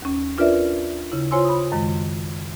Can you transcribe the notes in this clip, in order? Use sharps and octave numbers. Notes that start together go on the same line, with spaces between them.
D#2 C#4
D4 F4 A#4 B4 D5 E5
C#3 E4
F4 C5 C#5 G#5 C6 E6
B5 D#6
F#2 D#3 G#3